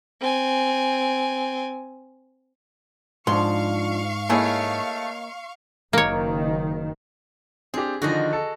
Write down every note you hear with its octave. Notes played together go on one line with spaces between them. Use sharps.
C4 G#5
G#2 F3 D4 F5 C6 C#6
A3 A#3 E4 G#4 C#5 D#5
F#1 D#3 A#3 C#5
C4 D4 G4 G#4
D3 D#3 F3 F#4 G#4 D#5
A4